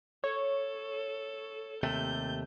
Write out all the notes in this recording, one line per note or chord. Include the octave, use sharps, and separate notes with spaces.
A4 C#5
D#2 C3 A3 G6